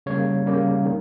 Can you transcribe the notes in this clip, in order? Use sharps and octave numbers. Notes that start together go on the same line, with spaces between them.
C#3 G3 A#3 C#5
C#3 G3 A#3
D#3